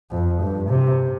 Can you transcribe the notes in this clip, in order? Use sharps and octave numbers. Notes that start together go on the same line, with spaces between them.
F2
G2
C3